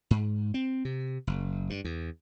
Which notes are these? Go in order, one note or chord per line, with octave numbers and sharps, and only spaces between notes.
G#2
C4
C3
F#1
G2
E2